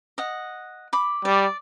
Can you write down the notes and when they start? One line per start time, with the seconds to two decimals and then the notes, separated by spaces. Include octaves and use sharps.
0.18 D#5 F#5
0.93 B5 D6
1.25 G3 D5